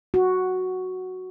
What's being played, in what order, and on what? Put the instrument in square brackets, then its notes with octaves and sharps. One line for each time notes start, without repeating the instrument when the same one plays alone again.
[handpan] F#4